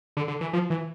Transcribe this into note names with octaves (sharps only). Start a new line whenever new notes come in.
D3
D3
E3
F3
E3